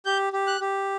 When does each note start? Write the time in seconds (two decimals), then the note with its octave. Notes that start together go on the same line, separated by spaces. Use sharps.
0.05 G4 G6
0.33 G4
0.47 F#6
0.61 G4